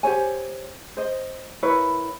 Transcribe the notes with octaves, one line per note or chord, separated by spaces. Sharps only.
G4 C5 C#5 G#5
C5 D#5
E4 A#4 B4 C#5